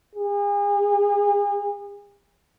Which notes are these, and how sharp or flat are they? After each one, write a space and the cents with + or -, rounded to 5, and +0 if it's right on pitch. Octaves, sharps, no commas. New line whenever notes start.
G#4 -40